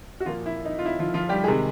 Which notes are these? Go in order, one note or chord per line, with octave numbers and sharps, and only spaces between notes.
F#4
A#2 F3 A#3 F4
E4
D#4
F4
E4
F3 F4
F3 F4
G3 G4
C3 D#3 G#3 G#4